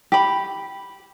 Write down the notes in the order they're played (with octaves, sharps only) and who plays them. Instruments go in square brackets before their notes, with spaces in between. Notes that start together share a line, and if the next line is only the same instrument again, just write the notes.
[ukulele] G4 B5